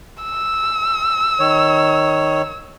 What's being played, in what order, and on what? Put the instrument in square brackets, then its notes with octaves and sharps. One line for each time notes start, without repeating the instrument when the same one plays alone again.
[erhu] E6
[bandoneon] D#3 C#5